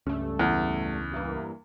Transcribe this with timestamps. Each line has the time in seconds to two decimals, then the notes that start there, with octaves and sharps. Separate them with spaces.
0.06 C#2 G2 A3 C#4
0.39 E2
1.12 G2 E3 A#3